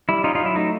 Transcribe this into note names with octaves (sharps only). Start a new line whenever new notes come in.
G3 E4
C#4 D#4 F4
D#4 F4
F#3
E4
A3 D#4